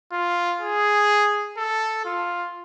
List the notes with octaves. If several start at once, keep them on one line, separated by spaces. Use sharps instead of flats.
F4
G#4
A4
F4